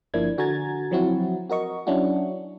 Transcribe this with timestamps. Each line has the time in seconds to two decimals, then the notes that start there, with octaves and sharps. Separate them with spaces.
0.14 G1 F3 A#3 D4 E4 G#6
0.38 D3 F#4 G#5 A#5 G#6 A6
0.91 F3 F#3 C4 E4 F#4
1.50 F#4 A#4 D#5 C#6
1.87 F#3 C#4 D4 E4 F#4